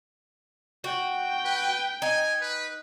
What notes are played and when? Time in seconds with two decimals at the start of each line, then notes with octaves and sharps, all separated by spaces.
0.84 F#4 G5
1.44 B4
2.02 D#4 G#5
2.41 B4